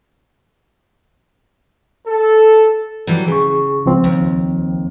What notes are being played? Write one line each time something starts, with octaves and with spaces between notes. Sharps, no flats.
A4
E3 F#3 G3
C#3 G#4 C#6
C#2 F3 C4
D#2